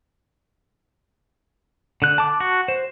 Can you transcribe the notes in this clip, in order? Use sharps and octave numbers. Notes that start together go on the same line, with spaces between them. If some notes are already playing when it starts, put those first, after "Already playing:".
D3 F#6
A5 D6
F#4
C5